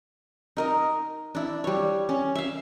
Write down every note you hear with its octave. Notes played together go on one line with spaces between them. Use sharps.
D#4 A#4 D#5
D4 E4
G3 C#5
C#4
E5 F5